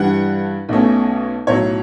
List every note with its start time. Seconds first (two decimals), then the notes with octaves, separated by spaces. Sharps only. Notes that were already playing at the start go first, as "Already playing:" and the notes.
Already playing: G2 E3 G3 D4 F#5
0.69 B1 B2 A3 C#4
1.47 B1 A2 F#3 C#5